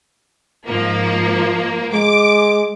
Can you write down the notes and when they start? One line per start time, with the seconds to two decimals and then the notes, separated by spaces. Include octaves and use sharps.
0.67 G#2 F3 A#3
1.94 G#3 D6